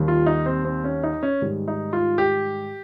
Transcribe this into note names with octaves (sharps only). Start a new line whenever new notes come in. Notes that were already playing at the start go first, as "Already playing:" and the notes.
Already playing: D#2 D#3 G3
F4
D#4
C4
C4
C#4
D#4
C#4
G#2 D#3 G3
D#4
F4
G4